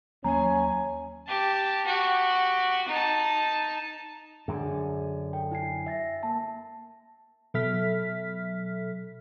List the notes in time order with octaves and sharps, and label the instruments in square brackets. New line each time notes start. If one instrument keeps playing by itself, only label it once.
[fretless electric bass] D#2 F#3 A#3 [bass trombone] C#4 [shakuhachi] G#5 [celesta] A#5
[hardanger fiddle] G4 A5
F#4 G4
D#4 A5
[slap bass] F#2 D3 [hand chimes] G#4 G#5
[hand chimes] A4 G5
E4 G#5 C7
E5 A6 A#6
A#3 A5
[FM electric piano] B2 F#3 A4 E5 F6 B6